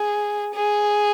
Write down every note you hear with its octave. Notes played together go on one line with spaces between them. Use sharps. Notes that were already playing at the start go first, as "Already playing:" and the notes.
Already playing: G#4
G#4